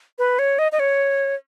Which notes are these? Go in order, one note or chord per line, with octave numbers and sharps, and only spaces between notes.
B4
C#5
D#5
D#5
C#5